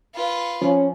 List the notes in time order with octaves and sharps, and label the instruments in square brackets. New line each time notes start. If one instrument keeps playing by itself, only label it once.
[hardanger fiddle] F4 B4
[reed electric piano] F3 [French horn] C#4